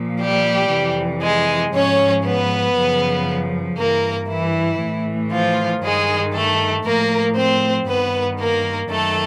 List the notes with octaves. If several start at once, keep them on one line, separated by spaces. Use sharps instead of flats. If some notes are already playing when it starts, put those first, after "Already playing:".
Already playing: A#2 F3
G3 G4
F2 C3 E3
G#3 G#4
G#2 F3 C#4 C#5
B3 B4
F#2 C#3 F3
G2 E3 A#3 A#4
E3 E4
A2 E3
F3 F4
G2 D#3 G#3 G#4
A3 A4
A2 F3 A#3 A#4
C4 C5
G2 D#3 B3 B4
A#3 A#4
F#2 D#3 A3 A4